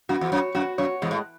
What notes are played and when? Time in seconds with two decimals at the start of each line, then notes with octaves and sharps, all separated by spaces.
0.09 F#2 F#4
0.21 E2
0.32 F#2 C#5
0.55 F#2 F#4
0.78 F#2 C#5
1.02 E2 G#3
1.11 A2